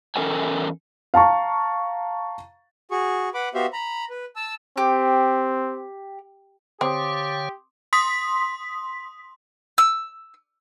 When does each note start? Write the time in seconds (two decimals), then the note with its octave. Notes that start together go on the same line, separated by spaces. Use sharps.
0.16 E2 C#4 A4 A#4 G5 G#5
1.14 F5 A5 A#5 C#6
2.91 F#4 G#4 C#6
3.34 B4 F#5 B5 D6
3.54 B3 F#4 G4 C5 E5 F5
3.73 A#5 B5
4.10 B4
4.36 A5 E6
4.77 C4 G4
6.81 D3 C4 G4 C#5 F5 C6 D6 D#6
7.93 C6 D#6 B6
9.78 E6